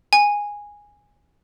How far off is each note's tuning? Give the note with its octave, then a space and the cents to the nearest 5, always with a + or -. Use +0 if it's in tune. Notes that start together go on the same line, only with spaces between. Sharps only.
G#5 -10